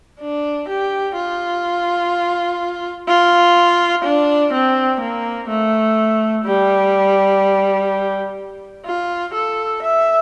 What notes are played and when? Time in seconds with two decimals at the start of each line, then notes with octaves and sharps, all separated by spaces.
0.20 D4
0.69 G4
1.16 F4
3.08 F4
4.04 D4
4.53 C4
5.00 A#3
5.49 A3
6.45 G3
8.85 F4
9.33 A4
9.82 E5